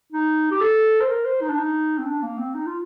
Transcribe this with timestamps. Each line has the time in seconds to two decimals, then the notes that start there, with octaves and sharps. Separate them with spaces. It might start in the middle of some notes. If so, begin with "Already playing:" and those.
0.12 D#4
0.51 G4
0.61 A4
1.01 C5
1.09 A#4
1.25 C5
1.42 D#4
1.50 D4
1.59 D#4
1.98 C4
2.06 D4
2.22 A#3
2.38 C4
2.55 D#4
2.66 F4